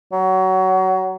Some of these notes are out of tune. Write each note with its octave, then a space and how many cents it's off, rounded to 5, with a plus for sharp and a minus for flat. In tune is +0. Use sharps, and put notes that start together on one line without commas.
F#3 +25